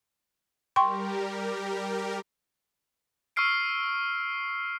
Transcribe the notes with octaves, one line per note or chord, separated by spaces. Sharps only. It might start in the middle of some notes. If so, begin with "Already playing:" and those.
G3 G4 A#4 G5 C6 C#6
C#6 E6 F6 C7 D7